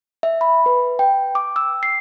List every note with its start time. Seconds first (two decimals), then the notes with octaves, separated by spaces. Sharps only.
0.23 E5
0.41 B5
0.66 B4
0.99 G5
1.35 D6
1.56 E6
1.83 C7